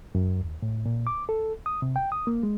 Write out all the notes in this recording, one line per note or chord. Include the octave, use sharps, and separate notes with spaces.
F#2
D#2
A2
A#2
D6
A4
D#6
C3
G5
D#6
A#3
G#3